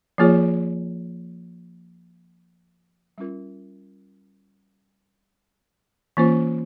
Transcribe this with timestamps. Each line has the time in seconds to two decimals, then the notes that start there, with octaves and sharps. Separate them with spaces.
0.18 F3 A#3 F4 G#4 C#5
3.18 G3 C#4 F4 A#4
6.17 E3 A#3 C#4 F4 C5